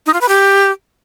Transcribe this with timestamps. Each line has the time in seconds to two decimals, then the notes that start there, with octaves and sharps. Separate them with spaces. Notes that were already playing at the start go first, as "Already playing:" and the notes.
0.06 D#4
0.14 F4
0.21 B4
0.29 G4